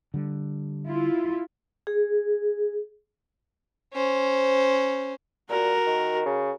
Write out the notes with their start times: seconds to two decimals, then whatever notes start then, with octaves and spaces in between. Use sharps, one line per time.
0.14 D3 G3
0.89 E4 F4
1.87 G#4
3.94 C#4 C5
5.49 A#2 F#4 A#4
5.87 D#3
6.26 C#3